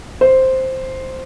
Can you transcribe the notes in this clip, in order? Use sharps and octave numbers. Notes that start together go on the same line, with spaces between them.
C5